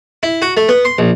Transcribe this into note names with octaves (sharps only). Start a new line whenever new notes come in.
E4
F#4
A3
B3
C6
A#1